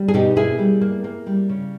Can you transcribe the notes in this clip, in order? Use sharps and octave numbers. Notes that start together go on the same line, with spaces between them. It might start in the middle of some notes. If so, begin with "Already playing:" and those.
Already playing: G3
G#4
B2 D#4 G4
A#3 E4 G#4
G3
A#3
A#3
G3
C#3